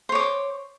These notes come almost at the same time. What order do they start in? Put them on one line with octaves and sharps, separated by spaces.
C5 C#5 D6